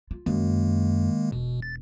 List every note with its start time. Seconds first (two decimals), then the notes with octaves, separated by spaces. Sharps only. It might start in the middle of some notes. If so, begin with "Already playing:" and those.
0.11 F4
0.26 F#2 D#3 G#3 A#3
1.32 E1 B2
1.62 A6